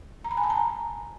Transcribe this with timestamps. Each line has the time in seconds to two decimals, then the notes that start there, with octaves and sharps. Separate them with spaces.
0.24 A#5
0.31 B5
0.37 G#5
0.44 A5
0.50 A#5